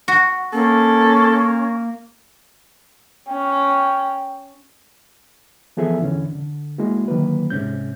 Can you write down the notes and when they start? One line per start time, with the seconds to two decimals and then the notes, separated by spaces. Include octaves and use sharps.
0.08 F#4
0.53 A#3 C#4 A4
3.28 C#4 G5
5.77 E3 F3 B3 G#4 A4 E5
6.01 E2 D3 E3 C#4
6.35 D3
6.78 G#3 A#3 E4 F#4
7.08 D3 D#3 F#3 A#3 B4
7.50 C2 G#2 C3 C#4 G6